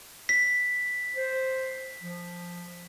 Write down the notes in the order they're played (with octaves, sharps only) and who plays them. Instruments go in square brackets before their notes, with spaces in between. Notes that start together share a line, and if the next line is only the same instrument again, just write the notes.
[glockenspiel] B6
[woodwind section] C5
F3